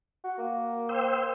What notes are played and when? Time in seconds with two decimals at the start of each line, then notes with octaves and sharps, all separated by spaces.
0.24 F#4
0.38 A#3
0.89 C5 G5 E6